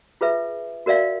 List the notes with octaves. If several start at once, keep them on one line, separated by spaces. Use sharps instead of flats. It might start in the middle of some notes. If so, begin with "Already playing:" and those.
F4 G#4 B4 E5
F#4 A#4 D5 E5 F5